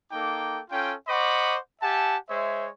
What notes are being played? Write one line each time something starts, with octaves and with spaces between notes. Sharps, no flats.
A#3 D#4 A4 G5 D6
C#4 F4 A4 G5
C5 D#5 F#5 B5 C#6 D6
G4 E5 F#5 G#5 A5
G#3 C5 C#5 E5